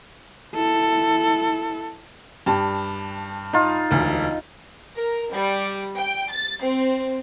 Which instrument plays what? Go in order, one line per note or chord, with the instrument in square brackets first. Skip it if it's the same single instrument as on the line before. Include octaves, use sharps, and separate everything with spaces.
[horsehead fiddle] E4 A4
[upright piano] G2 G4 A5
[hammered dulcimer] D#4 F4
[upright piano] E1 D2
[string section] A#4
G3
G5
A6
C4